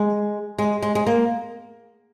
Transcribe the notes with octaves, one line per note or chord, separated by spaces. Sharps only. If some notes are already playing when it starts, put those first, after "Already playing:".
Already playing: G#3
G#3
G#3
G#3
A#3